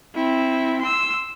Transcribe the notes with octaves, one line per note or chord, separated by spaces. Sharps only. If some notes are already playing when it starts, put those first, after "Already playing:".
C4 E4
C6 E6